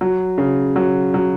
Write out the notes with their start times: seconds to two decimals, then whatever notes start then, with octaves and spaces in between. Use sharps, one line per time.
0.01 F#3
0.38 C#3
0.76 F#3
1.14 F#3